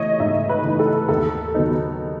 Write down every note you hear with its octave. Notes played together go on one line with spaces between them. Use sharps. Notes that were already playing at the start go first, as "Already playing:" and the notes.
Already playing: E3 A3 C#5 D#5
G#2 E5
B4
E3 A3 D#4
A4
D#2 A4
D#3 F#3 B3 D#4